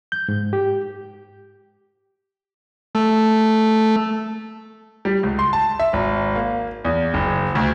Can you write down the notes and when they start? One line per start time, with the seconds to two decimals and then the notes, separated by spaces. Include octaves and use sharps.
0.12 G6
0.28 G#2
0.53 G4
2.95 A3
5.05 G3
5.23 C#2
5.39 C6
5.53 A5
5.79 E5
5.93 G#1
6.36 A#3
6.85 E2
7.14 F#1
7.55 D2